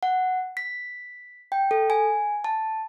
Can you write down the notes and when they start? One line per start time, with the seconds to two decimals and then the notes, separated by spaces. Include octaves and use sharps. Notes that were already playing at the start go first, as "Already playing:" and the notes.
0.03 F#5
0.57 B6
1.52 G5
1.71 A4
1.90 G#5
2.44 A5